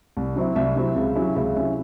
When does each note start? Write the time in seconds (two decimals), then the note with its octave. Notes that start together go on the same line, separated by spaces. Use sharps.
0.17 C2
0.36 C3 F#3 C4 E4
0.56 C2 E5
0.76 C3 F#3 C4 E4
0.96 C#2
1.15 C3 F#3 C#4 E4
1.36 C#2 E5
1.56 C3 F#3 C#4 E4 E5